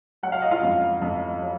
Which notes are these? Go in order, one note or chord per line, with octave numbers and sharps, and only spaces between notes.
F#3 F#5
F5
D#5
F4 F5
F2
F2
F#3